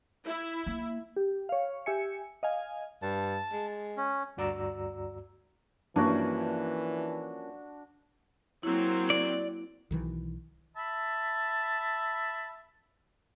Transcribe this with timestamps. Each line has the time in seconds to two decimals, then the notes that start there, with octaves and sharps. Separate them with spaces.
0.25 E4
0.66 A#3
1.17 G4
1.49 C#5 F5
1.86 G4 E5 G#5 C#7
2.43 D#5 F5 G#5
3.02 G2 A5
3.52 G#3
3.97 C#4
4.37 D2 G2 F#4 D5 A#5 E6
5.96 G2 E3 F3 A#3 C#4 D4 F#4
8.63 F#3 A#3 C4 E4
9.10 D5
9.91 B1 D#3 E3
10.77 E5 A5 B5